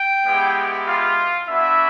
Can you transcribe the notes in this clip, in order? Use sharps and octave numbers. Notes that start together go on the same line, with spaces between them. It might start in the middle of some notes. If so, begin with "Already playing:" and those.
Already playing: G5
G#3 B3 E4 G4
F4 F5
B3 D4 E4 F#4 E5